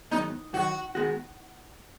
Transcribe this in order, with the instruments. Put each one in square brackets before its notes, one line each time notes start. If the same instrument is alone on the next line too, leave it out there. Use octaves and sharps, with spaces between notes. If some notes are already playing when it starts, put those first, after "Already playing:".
[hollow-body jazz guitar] G#2 D#3 F#3 B3 [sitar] D#4
[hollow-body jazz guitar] F#2 D#3 F#3 [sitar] F#4
[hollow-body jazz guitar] D#3 G#3 B3 F#4